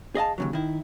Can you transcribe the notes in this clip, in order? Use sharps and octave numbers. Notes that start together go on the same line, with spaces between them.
G#4 D#5 F5 A5
D#2 C#3 F#3
D#3 E4